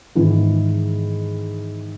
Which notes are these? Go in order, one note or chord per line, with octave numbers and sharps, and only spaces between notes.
G#2 D#3 E3 B3